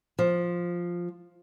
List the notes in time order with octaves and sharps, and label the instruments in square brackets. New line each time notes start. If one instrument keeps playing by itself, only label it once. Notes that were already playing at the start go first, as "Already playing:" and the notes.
[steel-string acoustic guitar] F3